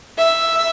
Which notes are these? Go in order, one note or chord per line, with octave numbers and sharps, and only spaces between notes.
E5